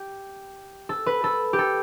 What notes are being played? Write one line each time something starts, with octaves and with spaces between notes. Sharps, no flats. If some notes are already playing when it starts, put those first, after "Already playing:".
Already playing: G4
A4
B4
A4
G4
A4